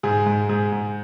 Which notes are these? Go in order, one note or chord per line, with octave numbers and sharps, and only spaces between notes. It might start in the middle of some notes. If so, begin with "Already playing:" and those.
G#2 G#4
G#2
G#2 G#4
G#2